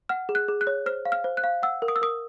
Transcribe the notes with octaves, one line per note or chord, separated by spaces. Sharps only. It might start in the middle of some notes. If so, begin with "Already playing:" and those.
F#5 F6
G#4
F#6
G#4
F#6
C#5
C5 F6
F5
F6
C5
F#6
F5
F#5 E6
A#4
D#6
E6
A#4 D#6